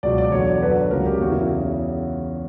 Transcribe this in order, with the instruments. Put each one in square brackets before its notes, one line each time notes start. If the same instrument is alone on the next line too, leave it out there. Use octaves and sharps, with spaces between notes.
[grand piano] C#2 B2 F#3 D5
D5
E2 D3 F#3 C#5
D5
F#2 D3 F#3 B4
C#2 C#3 F#3 A#4
G4
E2 C#3 F#3 F#4
E4